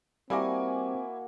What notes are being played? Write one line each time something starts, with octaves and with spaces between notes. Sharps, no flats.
G3 A#3 C4 E4 F#4 G#5 A#5 D6